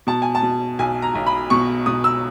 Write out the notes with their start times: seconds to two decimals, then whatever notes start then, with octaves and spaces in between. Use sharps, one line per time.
0.07 B2 A5
0.22 G#5
0.35 A5
0.43 B2
0.79 B1 G#5
1.02 A#5
1.15 B1
1.27 B5
1.50 B2 C#6
1.86 B2 D#6
2.04 E6